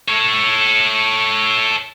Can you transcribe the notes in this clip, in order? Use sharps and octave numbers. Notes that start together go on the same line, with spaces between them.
A4 C#5